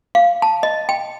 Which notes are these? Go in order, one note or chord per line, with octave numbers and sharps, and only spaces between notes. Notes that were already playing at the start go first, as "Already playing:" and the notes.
F5
A5
D#5
G5